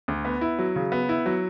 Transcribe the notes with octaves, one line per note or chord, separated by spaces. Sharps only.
D2
B3
E4
F#3
C#3
B3
E4
F#3